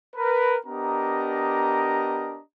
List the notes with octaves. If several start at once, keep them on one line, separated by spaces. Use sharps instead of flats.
A#4 B4 B5
B3 D4 G4 A#4 D#5 A#5